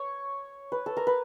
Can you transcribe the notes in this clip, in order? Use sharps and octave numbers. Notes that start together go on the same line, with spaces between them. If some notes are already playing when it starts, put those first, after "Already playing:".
Already playing: C#5
B4
A4
A#4
B4